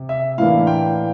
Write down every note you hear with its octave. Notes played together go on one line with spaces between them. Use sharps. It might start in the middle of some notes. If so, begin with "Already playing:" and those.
Already playing: C3
E5
A2 E3 A#3 D4 F5
G5